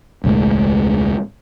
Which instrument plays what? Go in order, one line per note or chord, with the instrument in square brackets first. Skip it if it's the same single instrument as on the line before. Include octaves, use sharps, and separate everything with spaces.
[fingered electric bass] E1 C#2 A2 G#3